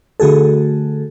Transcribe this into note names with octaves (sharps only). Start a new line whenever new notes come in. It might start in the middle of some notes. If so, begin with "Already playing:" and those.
D3 A3 F#4 G#4 A4